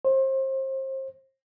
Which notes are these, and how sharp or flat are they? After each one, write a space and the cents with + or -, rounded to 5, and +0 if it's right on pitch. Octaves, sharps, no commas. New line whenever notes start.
C5 +30